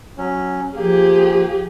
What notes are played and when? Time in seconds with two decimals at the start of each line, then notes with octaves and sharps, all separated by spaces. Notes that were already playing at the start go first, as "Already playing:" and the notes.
0.18 F#3 C#4
0.76 F3 A#3 G4 G#4